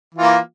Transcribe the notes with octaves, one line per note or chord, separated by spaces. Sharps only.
E3 A#3 F4